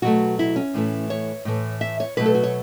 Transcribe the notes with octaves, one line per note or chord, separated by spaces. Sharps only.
B2 F#3 A3 F#4
E4
C#4
A2 E3 A3
C#5
A2 E3 A3
E5
C#5
B2 F#3 A3 B4
A4
F#4
C#5